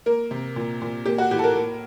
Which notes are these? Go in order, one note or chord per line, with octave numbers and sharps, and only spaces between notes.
A#3 A#4
C3
A#2
A#2
A#3 G4
F#4
A2 G4
A4
A#4
A#3